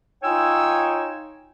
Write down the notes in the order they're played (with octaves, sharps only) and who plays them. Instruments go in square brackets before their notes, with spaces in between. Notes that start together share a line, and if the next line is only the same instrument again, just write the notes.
[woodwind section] D#4 F4 C#5 G5 G#5 E6